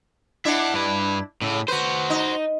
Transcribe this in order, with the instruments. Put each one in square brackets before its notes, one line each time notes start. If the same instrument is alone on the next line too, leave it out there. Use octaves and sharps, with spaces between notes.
[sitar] D4 E4 [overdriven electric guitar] E5 F#5
[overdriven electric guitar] G2 B4
[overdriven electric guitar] A2 [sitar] C#3
[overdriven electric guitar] F#4 C5 [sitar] B4
[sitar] D#4